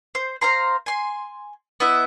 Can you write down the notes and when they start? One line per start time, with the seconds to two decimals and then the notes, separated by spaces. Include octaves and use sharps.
0.15 C5
0.41 C5 F5 A#5 C6
0.86 G#5 C6
1.80 B3 E4 D#5 E5